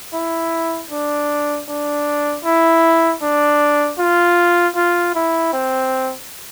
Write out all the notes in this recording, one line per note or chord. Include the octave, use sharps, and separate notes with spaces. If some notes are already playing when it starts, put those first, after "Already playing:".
E4
D4
D4
E4
D4
F4
F4
E4
C4